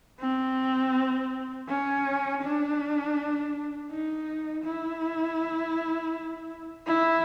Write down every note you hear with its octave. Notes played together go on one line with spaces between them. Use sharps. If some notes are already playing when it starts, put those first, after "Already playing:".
C4
C#4
D4
D#4
E4
E4